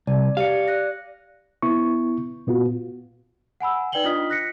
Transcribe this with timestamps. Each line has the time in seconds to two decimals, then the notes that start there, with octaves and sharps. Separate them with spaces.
0.07 C2 D5
0.37 G4 D5 F5 C#7
0.68 D5 F#6 A#6
1.62 B3 E4 C#6
2.47 A#2 B3 F4 F#4
3.61 F#5 G#5 B5 E6
3.92 D#4 B4 D5 G5 F#7 G7
4.04 D4 F4 D#5 D#6 F6 B6
4.30 F#6 A#6 B6 C#7